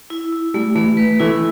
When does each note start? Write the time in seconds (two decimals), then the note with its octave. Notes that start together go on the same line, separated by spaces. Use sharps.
0.10 E4
0.32 E4
0.54 G3 A3
0.75 E3 A3
0.97 B4
1.20 E3 A3 E4